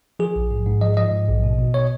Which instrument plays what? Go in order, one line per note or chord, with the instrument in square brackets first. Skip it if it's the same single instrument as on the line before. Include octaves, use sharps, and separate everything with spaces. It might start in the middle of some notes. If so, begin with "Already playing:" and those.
[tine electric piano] F3 G#4
A#1
G#2
G#2
F3 D#5
F3 D#5
G#2
A#1
B2
B2
B2 C#5